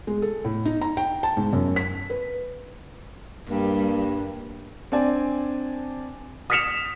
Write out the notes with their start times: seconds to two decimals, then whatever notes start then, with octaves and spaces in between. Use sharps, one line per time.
0.07 G#3
0.22 A4
0.45 A2
0.65 D#4
0.81 A#5
0.97 G5
1.23 A5
1.37 G#2
1.53 F#2
1.76 B6
2.10 B4
3.49 G2 G3 A#3
4.92 C4 D4 D5 G#5
6.50 D#6 F6 B6 C#7 E7 F7